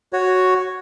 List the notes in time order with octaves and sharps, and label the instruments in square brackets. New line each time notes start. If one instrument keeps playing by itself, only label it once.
[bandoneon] F#4 C#5